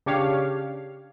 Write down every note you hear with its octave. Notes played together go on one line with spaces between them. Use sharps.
C#3 D4 G4 C#5 F5